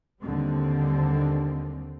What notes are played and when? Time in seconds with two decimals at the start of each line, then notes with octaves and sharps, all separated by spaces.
0.22 D#2 D3 G3 C4